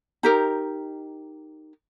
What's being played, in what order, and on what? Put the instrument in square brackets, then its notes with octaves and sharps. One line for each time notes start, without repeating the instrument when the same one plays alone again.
[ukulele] D#4 G4 A#4